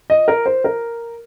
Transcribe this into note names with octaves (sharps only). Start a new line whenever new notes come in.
D#5
A#4
C5
A#4